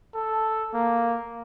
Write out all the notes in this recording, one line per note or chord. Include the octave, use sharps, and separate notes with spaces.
A4
A#3